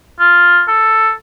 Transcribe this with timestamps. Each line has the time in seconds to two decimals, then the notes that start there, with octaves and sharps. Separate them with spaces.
0.20 F4
0.68 A4